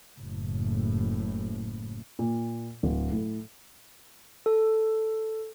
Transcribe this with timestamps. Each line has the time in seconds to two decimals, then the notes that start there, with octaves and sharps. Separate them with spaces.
0.17 F#1 A2
2.19 A#2
2.83 D1
3.12 A2
4.46 A4